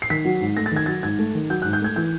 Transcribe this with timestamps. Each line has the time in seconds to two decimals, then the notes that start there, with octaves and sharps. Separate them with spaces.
0.02 C7
0.10 D#3 B6
0.25 F#3
0.41 G#2
0.57 A3 A#6
0.66 A6
0.72 D#3 G#6
0.86 F#3 A6
1.03 G#2 G#6
1.19 A3
1.35 D#3
1.50 F#3 G6
1.62 F#6
1.65 G#2
1.73 G6
1.81 A3 G#6
1.96 E3 G6